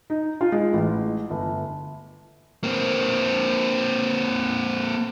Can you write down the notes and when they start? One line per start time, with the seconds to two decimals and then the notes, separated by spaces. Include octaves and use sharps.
0.10 D#4
0.41 F4
0.52 G#3
0.73 A1
1.30 G1
2.64 A#3 C4